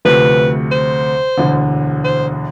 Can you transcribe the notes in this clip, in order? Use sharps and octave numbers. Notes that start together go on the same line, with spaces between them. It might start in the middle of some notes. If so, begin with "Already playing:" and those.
D2 C3 F3 A3 B4
C5
E1 D2 D3
C5